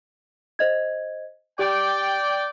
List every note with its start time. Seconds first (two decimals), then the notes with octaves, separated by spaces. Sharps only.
0.59 C5 D#5 G#6
1.59 G4 D5 G5 D7